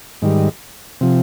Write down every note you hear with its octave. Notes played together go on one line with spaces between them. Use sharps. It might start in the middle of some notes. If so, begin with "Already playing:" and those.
G#2 D#3 G3
C3 F3